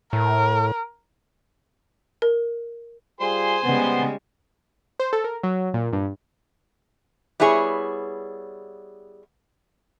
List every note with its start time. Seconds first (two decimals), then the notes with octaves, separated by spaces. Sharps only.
0.13 A2 A#4
2.22 A#4
3.20 G3 F4 G#4 C5 G#5 C6
3.64 C#3 G3 G#3 B3
5.00 C5
5.13 A4
5.24 A#4
5.43 F#3
5.74 A#2
5.93 G2
7.40 G3 B3 E4 G#4 C#5